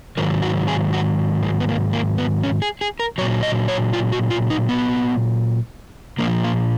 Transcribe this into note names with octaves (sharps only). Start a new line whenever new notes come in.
G#2 D#3 F#3 A#4
F#4
G#4
F#4
G#3
B3
A#3
A#3
B3
C#4
G#4
G#4
A#4
A#2 F#3 C#5
D#5
C#5
F4
F#4
F4
D#4
B3
A#2 F3 A#3
A#3